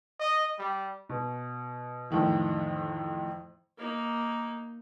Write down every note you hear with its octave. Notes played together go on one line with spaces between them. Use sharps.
D#5
G3
B2
F2 A2 D#3 E3
A#3 D#4